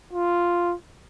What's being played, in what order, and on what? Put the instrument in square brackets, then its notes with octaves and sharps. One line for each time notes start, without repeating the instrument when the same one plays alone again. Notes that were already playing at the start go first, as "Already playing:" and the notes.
[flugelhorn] F4